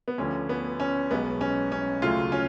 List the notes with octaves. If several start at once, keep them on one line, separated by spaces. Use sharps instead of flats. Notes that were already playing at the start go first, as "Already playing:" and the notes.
B3
D2 D3 F3 C#4
B3
C#4
B1 B2 G#3 B3
C#4
C#4
D2 C#3 F#3 A3 F4
C#4